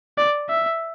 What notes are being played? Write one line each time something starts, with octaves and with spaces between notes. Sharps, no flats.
D5
E5